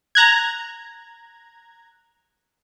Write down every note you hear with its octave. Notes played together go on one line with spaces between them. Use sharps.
A#5 F#6 G#6